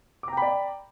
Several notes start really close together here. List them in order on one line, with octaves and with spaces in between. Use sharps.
D6 A#5 G5 B5 D5